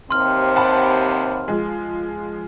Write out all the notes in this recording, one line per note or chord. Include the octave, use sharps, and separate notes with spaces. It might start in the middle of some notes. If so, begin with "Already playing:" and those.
D#2 C3 C4 C6 F6
F#5 A5 B5
F3 G#3